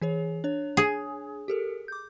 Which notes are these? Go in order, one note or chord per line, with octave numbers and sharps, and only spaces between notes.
E3 G#4 C#5
D4 C#5
G#4
G4 A4 A#4
D6 G6